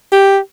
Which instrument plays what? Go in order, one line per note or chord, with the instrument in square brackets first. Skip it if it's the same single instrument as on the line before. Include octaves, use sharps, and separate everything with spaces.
[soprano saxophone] G4